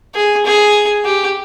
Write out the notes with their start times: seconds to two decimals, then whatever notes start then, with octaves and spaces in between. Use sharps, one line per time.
0.15 G#4
0.45 G#4
1.05 G4